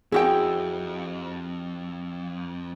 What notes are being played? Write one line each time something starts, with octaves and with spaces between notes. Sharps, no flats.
F2 E4 F#4 G#4 G5